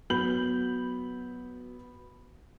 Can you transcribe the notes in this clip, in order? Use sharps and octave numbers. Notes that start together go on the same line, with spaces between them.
F#3 B3 B5 G6 F#7